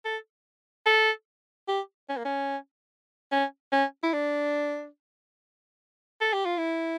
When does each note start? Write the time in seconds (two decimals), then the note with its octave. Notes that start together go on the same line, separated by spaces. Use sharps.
0.05 A4
0.86 A4
1.68 G4
2.09 C#4
2.17 A#3
2.25 C#4
3.32 C#4
3.72 C#4
4.03 E4
4.13 D4
6.21 A4
6.33 G4
6.45 F4
6.58 E4